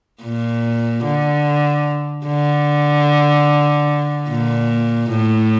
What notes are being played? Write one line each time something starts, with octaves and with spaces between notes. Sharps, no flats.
A#2
D3
D3
A#2
A2